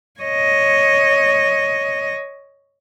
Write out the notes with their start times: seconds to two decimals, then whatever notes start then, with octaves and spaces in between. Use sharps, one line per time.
0.20 C#5 D#5